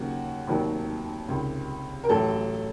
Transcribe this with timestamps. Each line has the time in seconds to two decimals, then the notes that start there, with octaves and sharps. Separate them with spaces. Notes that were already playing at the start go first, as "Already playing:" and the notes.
Already playing: D#2 C#3 F#3 F#4
0.47 F1 D#2 D#3 F#3
1.28 C#2 C3 D#3
2.04 A#4
2.09 A1 A2 F#3 A4